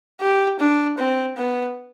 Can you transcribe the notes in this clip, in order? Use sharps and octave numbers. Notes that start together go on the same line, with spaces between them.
G4
D4
C4
B3